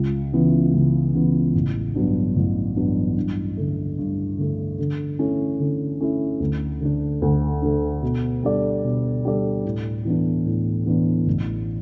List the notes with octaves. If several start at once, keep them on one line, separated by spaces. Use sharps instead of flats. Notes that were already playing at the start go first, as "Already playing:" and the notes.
Already playing: C#2
C#3 E3 B3
C#2
C#3 E3 B3
A1
G2 F#3 B3 D4
A1
G2 F#3 B3 D4
G2
D3 A3
G2
D3 A3
D3
A3 C#4 E4
D3
A3 C#4 E4
D2
D3 A3 D4
D2
D3 A3 D4
B2
G3 D4 A4 D5
B2
G3 D4 A4 D5
A2
E3 B3 D4
A2
E3 B3 D4
A1